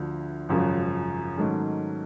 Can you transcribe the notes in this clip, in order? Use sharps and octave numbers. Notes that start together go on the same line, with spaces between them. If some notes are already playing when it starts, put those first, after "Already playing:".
Already playing: D2 D3 F3
G#1 F#2 C#3 F3
G#2 D#3 F#3 A3 C#4